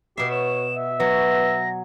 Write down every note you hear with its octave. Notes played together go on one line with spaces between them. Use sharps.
B2 G4 E5 C7
C#5 E7
E5
F#3 B3 A#6